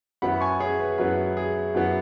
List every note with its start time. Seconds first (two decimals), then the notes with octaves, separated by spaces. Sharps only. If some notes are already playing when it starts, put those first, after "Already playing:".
0.22 F#2 F#3 B3 E4 F#5 B5
0.41 G#5 C#6
0.60 G#4 C#5
0.80 B4
0.98 F#2 F#3 B3 E4 B4
1.37 G#4
1.75 F#2 F#3 B3 E4